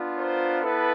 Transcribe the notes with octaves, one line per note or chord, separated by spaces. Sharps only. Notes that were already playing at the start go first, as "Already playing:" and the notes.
Already playing: B3 D4 F4
A#4 C5
B3 E4 A4 B4